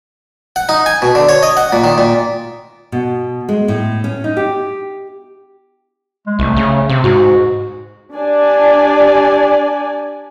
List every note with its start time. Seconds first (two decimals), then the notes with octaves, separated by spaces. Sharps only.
0.56 F#5
0.69 D#4
0.86 G#5
1.02 B2
1.15 D3
1.29 C#5
1.43 D#5
1.57 F#5
1.72 A#2
1.84 D#3
1.98 A#2
2.92 B2
3.49 G#3
3.68 A2
4.04 C#4
4.24 D#4
4.37 G4
6.27 G#3
6.39 C2 A3
6.57 C#3
6.89 C3
7.04 G#2 F#4
8.15 D4 G4 D5 G#5